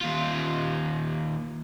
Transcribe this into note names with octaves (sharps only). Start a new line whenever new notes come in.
D#2 F4